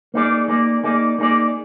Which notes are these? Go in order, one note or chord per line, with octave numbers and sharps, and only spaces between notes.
A#3 D#4 G#4 D5
A#3 D#4 G#4 D5
A#3 D#4 G#4 D5
A#3 D#4 G#4 D5